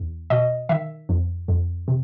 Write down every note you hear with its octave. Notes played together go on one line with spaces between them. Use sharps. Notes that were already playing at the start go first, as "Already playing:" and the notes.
Already playing: E2
B2 D#5
D#3 E5
F2
F2
C3